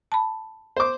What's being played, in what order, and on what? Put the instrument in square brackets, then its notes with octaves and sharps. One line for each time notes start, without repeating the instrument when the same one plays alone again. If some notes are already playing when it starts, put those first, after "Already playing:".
[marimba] A5 B5
[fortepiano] C5 D6